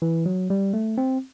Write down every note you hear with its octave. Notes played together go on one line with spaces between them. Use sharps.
E3
F#3
G3
A3
C4